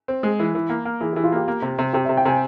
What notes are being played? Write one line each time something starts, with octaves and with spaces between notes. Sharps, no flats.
C4
G#3
E3
E3
A#3
A#3
E3 G#4
E3 G4
F4
A#3 G4
A#3
C3
C3
C3 G4
C3 E5
G5
C3 G#5